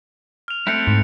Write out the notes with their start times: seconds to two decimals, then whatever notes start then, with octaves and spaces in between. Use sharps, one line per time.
0.48 F6 F7
0.67 A3 C4 E4 F#6 C#7 D7
0.87 G#2